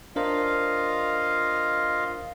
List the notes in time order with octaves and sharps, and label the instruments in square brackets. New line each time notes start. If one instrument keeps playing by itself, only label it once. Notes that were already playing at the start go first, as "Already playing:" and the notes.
[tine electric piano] D4 A#4 C5 [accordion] F4 D#5 F5